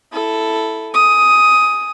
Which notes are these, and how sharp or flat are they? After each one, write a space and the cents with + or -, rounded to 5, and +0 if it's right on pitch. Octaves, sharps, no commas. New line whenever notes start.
E4 +0 A4 +0
G#5 +0 D#6 +10